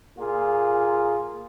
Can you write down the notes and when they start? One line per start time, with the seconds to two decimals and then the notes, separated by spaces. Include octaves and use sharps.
0.18 A#2 F4 G#4